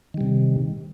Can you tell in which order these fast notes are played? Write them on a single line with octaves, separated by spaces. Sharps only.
D#3 G3 C3